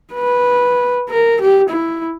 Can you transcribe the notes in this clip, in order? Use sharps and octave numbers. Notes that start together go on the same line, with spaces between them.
B4
A#4
G4
E4